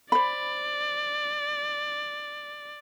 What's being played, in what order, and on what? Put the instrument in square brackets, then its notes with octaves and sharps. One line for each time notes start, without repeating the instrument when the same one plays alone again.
[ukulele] C5 B5 [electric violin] D5